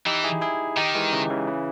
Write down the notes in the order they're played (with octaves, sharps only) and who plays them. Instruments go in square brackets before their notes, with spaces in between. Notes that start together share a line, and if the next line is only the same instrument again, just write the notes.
[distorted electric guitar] E3 [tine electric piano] D#4 G4
[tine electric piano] E4 G#4
E4 G#4
[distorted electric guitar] D#3 [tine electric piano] D#4 G4
[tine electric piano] E3 G#3
C#3 E3
C#3 E3
C#3 E3